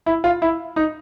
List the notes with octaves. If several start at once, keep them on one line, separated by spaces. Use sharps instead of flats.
E4
F4
E4
D#4